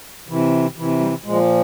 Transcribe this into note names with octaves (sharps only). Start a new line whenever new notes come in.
C3 E3
C3 E3
G3
A#2 F3 G#3